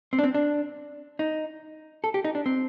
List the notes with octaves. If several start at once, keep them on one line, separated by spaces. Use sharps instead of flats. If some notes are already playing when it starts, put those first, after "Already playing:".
C4
D4
C4
D4
D#4
A4
G4
D#4
D4
C4